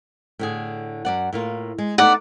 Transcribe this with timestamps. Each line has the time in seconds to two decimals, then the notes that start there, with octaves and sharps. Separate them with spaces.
0.39 A2 D3 G#4
1.05 F#2 D5 F#5
1.33 A2 A#3 F4
1.78 G#3
1.98 A3 B3 D#4 D5 F#5